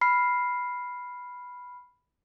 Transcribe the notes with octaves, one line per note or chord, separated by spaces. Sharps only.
B5 F6 C7